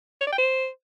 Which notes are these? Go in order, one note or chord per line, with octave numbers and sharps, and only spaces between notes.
C#5
D5
G5
C5